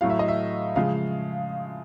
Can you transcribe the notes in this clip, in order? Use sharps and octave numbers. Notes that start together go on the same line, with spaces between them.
A2 F#3 A3 F5
E5
D#5
E5
C#3 F3 G#3 F5